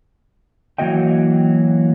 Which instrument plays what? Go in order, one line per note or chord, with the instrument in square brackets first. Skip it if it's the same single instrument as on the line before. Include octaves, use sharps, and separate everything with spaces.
[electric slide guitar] E3 F#3 A#3 F#4 D#5 G5